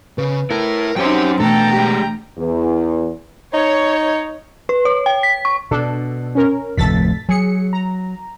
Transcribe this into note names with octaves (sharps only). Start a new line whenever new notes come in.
C#3 B4
E4 A4 A#4
F#2 C4 C#4 D#4 G4 G5
B2 E3 A3 D4 A4 G5 A#5
G#3 G4
E2
D#4 C#5
B4
C#5
G5
B6
C#6
B2 D4 A4
C#4 A#4
F1 D2 A2 A4 A6 B6
F#3 G#4 C#7
A#5